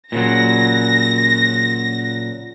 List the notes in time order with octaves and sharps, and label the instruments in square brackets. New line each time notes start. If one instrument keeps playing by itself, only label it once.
[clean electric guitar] A#2 C#3 F#3 [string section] A#6